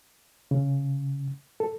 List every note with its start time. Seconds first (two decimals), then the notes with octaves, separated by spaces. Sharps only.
0.51 C#3
1.60 A4